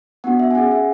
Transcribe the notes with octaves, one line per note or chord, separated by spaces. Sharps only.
B3 D4 F#4 F#5
E5
G#5
C#4 G#4 F#5
E5